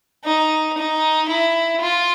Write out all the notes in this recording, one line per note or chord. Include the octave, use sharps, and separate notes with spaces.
D#4
D#4
E4
F4